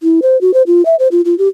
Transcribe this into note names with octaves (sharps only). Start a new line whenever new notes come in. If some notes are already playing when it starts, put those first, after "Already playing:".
E4
C5
F#4
C5
F4
E5
C5
F4
F4
G4